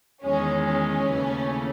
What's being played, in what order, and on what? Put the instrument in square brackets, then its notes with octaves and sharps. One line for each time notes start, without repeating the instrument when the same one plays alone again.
[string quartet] E2 D#3 G#3 [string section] C#4
[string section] C#4
[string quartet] D#2 C#3 E3 A3